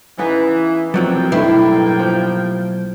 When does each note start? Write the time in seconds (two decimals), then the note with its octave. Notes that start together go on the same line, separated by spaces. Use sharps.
0.18 C#3 E3 B3 D#4
0.94 A2 F3 F#3 A#3 C4 G5
1.32 B1 G2 A3 E4
1.99 F3